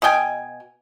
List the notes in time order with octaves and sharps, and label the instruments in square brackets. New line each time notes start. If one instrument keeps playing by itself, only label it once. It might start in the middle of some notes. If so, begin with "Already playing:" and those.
[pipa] B2 D#5 G5 G#5